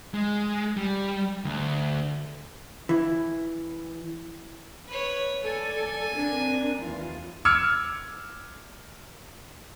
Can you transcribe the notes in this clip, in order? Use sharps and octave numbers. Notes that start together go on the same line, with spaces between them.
G#3
G3
D2
E3 E4
B4 C#5
A4 D5 G#5
C4 D4 A#4
D#2 E3 F4
D6 E6 F6 G#6 C#7